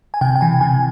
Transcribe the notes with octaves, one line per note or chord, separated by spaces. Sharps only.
G#5
C3 G5
G5
E3 G#5
C3 G#5